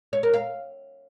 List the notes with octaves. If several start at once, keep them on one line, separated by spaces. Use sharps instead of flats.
C#5
A#4
F5